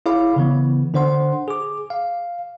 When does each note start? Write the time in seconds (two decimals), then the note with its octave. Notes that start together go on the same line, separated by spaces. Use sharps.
0.06 E4 G#4 C#5 F5 B5 D6
0.36 C#3 E3 B3
0.94 D3 D4 C5 F#5 C6
1.48 G#4 D6
1.90 F5